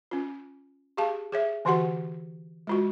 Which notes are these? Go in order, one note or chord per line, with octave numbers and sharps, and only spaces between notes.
C#4 F4
G4 G#4 F5 A5
G#4 C#5 E5
D3 E3 F#4 G4 F#5 C6
G#3 F4 F#4